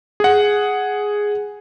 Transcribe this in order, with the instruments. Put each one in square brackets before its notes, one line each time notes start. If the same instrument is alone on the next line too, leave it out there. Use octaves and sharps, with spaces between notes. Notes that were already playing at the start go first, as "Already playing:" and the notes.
[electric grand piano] G#4 F#5